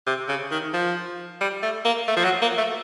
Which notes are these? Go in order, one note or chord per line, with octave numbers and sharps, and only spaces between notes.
C3
C#3
D#3
F3
G3
A3
A#3
A3
F3
F#3
A#3
A3